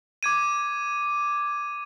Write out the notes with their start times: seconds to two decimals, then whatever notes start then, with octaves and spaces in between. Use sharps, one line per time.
0.23 D6 G#6 D#7